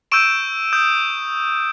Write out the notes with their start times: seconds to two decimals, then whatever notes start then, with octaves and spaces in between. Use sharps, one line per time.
0.12 C#6 E6 G6 D7 E7
0.73 D#6 G6